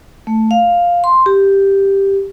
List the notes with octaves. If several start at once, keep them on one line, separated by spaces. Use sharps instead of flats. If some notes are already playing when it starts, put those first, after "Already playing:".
A3
F5
C6
G4